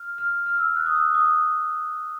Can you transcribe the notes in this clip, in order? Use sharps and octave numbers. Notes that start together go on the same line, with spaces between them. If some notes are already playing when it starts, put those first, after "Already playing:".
Already playing: F6
F6
F6
E6
F#6
D#6
E6
D#6